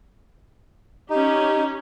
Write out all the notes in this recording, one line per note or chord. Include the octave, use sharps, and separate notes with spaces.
C#4 D#4 G4